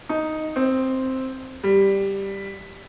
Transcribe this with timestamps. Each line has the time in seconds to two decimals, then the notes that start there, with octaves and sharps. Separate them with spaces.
0.09 D#4
0.56 C4
1.64 G3